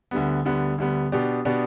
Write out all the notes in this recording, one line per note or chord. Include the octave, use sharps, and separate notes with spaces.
D2 D3 G3 B3
D2 D3 G3 B3
D2 D3 G3 B3
B2 B3 D4 G4
B2 B3 D4 G4